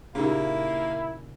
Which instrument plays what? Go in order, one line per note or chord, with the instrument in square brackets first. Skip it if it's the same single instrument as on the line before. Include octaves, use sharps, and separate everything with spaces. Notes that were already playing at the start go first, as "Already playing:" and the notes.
[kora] A#2 C#3 [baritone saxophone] A#3 [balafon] C#4 D#4 G4 [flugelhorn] E4